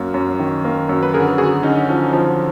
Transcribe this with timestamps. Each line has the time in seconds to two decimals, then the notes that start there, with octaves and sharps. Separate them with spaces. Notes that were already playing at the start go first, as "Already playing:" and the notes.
Already playing: F#2 A#3
0.14 F#2
0.39 D#3
0.64 A#3
0.89 F#2
1.03 B4
1.14 D3 G#4 A#4
1.38 D3 F#4 G#4
1.63 D3 C#4 D#4
1.89 F3
2.13 F3